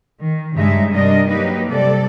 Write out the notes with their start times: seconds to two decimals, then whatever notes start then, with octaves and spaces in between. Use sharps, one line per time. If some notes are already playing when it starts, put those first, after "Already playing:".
0.21 D#3
0.54 G2 C#3 G#3 D#4 E5
0.91 G2 C3 G3 D4 A#4 D#5
1.28 F#3 A#3 D#4 G4 B4
1.66 C3 G3 A4 D5